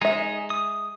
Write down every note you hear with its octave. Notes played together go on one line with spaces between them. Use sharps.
G#3 D#4 G#4 E5
D#6